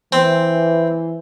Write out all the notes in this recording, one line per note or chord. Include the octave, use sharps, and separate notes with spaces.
E3 C4